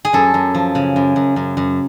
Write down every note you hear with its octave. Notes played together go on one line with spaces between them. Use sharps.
G#4
F#2 A4
F#2
F3
C#3
F#2
F#2
F#2
F#2